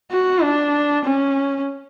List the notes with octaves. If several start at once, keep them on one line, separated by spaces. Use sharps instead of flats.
F#4
D4
C#4